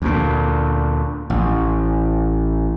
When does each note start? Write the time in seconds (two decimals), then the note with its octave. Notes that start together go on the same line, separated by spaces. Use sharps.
0.02 D2 A#2
1.30 A1